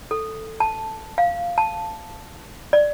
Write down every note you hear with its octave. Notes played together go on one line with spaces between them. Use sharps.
A4
A5
F5
A5
D5